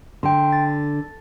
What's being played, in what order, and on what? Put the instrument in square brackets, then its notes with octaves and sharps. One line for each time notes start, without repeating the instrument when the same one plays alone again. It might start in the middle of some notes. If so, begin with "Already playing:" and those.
[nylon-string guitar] D3 [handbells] G5 C6
[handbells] A6